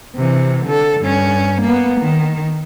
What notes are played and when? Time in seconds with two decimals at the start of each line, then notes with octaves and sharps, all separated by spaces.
0.16 C3 E3
0.65 D3 A4
1.00 G2 C#4
1.61 A#3 B3
2.00 D#3